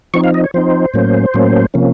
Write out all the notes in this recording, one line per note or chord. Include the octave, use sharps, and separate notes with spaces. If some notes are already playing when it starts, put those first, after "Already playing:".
F3 C4 D#4 C#6
F5
D#5
C#5
F3 C4 D#4 C5
A2 F#3 A#3 C#4
A2 F#3 A#3 C#4
C3 F3 A#3 C#4